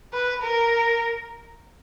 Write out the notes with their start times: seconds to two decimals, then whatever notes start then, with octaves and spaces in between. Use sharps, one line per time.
0.13 B4
0.43 A#4